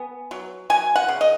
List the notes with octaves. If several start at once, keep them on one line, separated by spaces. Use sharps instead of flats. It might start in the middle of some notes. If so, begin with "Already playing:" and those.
Already playing: B3 G#5
F#3
F#3 G#5
F#5
C#3
D#5